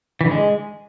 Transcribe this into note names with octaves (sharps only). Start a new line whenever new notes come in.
E3
D3
G#3